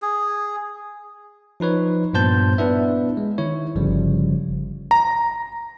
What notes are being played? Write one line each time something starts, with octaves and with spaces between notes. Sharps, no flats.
G#4
F3 D#4 B4 C#5
G2 A#2 B3 C5 A5 G6
B3 D4 E4 B4 E5
G#3
D#3 E4 C#5
G1 C#3 F3 G3
A#5